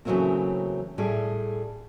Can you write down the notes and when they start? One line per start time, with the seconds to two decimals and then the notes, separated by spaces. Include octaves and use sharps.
0.05 C#3 E3 F#3 A3 A#3 C4
0.98 A2 G3 A3 G#4